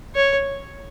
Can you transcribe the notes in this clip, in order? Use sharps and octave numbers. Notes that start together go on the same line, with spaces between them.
C#5